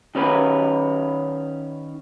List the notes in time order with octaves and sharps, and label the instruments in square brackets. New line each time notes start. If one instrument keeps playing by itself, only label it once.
[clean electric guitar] D#3 C#4 B4